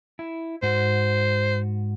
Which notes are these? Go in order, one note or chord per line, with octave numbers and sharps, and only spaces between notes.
E4
G#2 F#4 C5